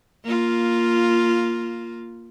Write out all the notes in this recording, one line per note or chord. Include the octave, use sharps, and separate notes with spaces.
A#3 F4